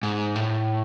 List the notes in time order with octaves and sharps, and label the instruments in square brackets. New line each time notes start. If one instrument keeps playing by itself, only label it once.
[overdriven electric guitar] G#2
A2